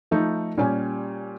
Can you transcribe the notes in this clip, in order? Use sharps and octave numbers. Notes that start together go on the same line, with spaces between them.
F3 A3 D#4
A#2 G3 C#4 G4 G#5